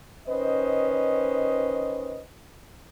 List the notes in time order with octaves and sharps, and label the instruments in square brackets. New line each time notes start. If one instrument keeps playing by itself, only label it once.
[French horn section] D#3 C#4 B4 C5 D#5